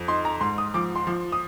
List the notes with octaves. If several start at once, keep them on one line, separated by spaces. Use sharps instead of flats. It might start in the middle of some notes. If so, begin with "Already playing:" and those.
Already playing: F2
D#4 C6
A#5
G#2 C6
D#6
F3 D6
C6
F3
D#6